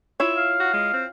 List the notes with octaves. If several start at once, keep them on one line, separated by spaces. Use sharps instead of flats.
E4 F4 C#5 E5
F5
F#4
G#3
C4